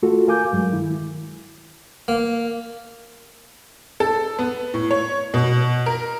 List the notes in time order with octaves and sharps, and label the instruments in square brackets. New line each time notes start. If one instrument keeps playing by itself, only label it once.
[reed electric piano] A3 F4 F#4 A4
A#4 F5 G#5 D6 G6
G2 F#3 G#3
D#3 E4
[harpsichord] A#3
[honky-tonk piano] A4
B3
A2
C#5
B2
A#4